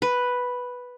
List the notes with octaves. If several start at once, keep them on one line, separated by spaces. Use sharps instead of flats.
B4